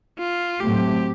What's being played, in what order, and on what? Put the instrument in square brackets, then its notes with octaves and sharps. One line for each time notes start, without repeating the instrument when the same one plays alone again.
[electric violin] F4
[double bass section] A2 F#3 A3 C4 [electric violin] G4